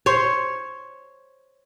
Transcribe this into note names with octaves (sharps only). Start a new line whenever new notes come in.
C5 C#5